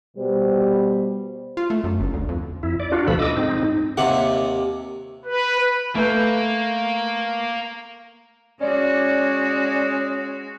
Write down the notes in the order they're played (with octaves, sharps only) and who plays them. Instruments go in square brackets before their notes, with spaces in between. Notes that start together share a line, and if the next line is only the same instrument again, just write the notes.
[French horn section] B2 G3 C5
[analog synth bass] F4
A3
F#2
G1
D2
F2
[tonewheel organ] F2 E4
D5
D4 F4 F#4
D2 B2 F3 A4 B5
D#5 D6 E6
G#2 C4 D#4
[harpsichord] D#2 C3 F#5
[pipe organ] B4
[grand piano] A3 B4 G6 [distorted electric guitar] A#3
[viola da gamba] G#3 F#4 [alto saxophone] C#4 [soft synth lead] D5